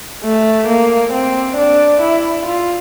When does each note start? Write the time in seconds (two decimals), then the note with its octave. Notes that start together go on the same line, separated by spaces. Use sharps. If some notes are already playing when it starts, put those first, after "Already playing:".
0.24 A3
0.68 A#3
1.13 C4
1.57 D4
2.01 E4
2.46 F4